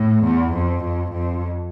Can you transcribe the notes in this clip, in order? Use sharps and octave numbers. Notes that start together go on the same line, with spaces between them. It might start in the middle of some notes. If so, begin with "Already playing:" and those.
Already playing: A2
E2
F2
F2
F2